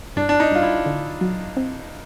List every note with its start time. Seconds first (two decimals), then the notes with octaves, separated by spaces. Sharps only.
0.16 G2 D4
0.29 D4
0.40 D#4
0.51 G2 F4
0.63 E4
0.86 D3
1.21 F#3
1.57 C4